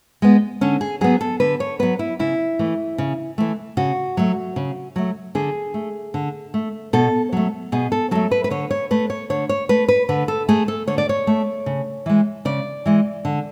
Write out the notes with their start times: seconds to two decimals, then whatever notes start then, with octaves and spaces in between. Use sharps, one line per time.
0.22 G#3 B3
0.61 D3 C#4
0.81 G#4
1.01 F#3 B3 G#4
1.21 A4
1.40 D3 B4
1.60 C#5
1.79 F#3 B3 B4
1.99 E4
2.19 C#3 E4
2.59 E3 A3
2.98 C#3
3.38 E3 A3
3.77 C#3 F#4
4.17 F#3 A3
4.56 C#3
4.96 F#3 A3
5.35 D3 G#4
5.74 A3
6.14 D3
6.54 A3
6.93 B2 A4
7.33 F#3 A3
7.72 B2 G#4
7.92 A4
8.11 F#3 A3 A4
8.31 B4
8.44 B4
8.50 D3 C#5
8.71 C#5
8.91 A3 B4
9.10 C#5
9.30 D3 C#5
9.49 C#5
9.69 A3 B4
9.88 B4
10.09 D3 B4
10.28 A4
10.49 A3 G#4
10.68 A4
10.88 D3 C#5
10.98 D5
11.09 C#5
11.27 A3
11.66 C#3
12.06 E3 G#3
12.45 C#3 D5
12.86 E3 G#3
13.25 D3